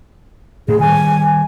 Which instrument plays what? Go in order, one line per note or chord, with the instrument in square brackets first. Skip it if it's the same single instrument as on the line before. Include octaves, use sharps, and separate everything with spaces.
[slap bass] A2 [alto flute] G#4
[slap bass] D#3 G3 [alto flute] G#5